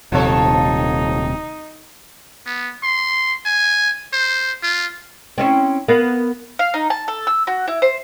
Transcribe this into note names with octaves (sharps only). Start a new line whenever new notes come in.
D#1 C3 F3 D#4 A4 C#5
B3
C6
G#5
C5
F4
C4 C#4 E4
B3 A#4 F5
F5
D#4
A5
A4
E6
F#4
E4
C5